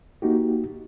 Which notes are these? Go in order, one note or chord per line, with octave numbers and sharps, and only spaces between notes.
A#3 D#4 F#4 G4